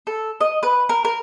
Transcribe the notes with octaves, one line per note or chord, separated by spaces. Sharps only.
A4
D#5
B4
A#4
A#4